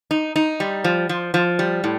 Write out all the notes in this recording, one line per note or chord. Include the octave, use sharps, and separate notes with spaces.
D#4
D#4
G3
F3
F3
F3
G3
A2